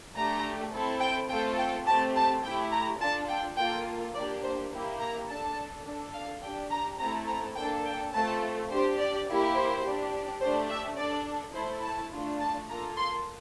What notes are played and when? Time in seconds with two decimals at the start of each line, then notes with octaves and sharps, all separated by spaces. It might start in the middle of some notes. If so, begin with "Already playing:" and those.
0.15 A3 D4 G4 A#5
0.72 C4 E4 A4
1.00 G5
1.29 A3 C4 F4 A4 G5
1.58 G5
1.86 A3 C4 G4 A5
2.15 A5
2.43 A3 E4 G4 G5
2.72 A#5
3.00 D4 F4 A4 A5
3.29 G5
3.57 A#3 F4 A4 G5
4.14 A#3 D4 G4 D5
4.43 C5
4.71 A#3 E4 G4
5.00 A#5
5.27 D4 A4 A5
5.85 D4 A4
6.13 F5
6.42 D4 G4 G5
6.70 A#5
6.99 A3 C4 E4 A4 A#5
7.27 A#5
7.56 A#3 D4 A4 G5
7.85 G5
8.13 A3 C4 F4 A4 A5
8.70 D4 G4 C5
8.98 D5
9.26 A#3 E4 G4
9.55 C5
9.83 D4 G4
10.40 A3 D4 G4 C5
10.69 E5
10.97 D4 A4 D5
11.54 A3 E4 A4 C5
11.83 A5
12.11 A3 D4 F4
12.39 A5
12.68 A#3 F4 A4 A#5
12.96 C6